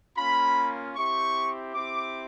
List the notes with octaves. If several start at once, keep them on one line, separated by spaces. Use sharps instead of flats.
A#3 C#4 F4 B5
C4 E4 G4 C#6
C4 E4 G4 D6